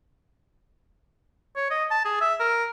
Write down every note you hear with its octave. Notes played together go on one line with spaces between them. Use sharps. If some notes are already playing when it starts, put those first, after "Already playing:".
C#5
D#5
A5
G#4
E5
A#4